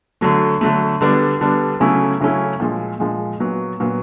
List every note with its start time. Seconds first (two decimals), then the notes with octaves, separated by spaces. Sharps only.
0.21 D3 F#3 A3
0.61 D3 F#3 A3
1.01 D3 G3 B3 D4
1.41 D3 G3 B3 D4
1.80 C#3 F#3 A3 C#4 E4
2.21 C#3 F#3 A3 C#4 E4
2.60 A#2 F3 G#3
3.00 A#2 F3 G#3
3.40 A#2 F#3 B3
3.80 A#2 F#3 B3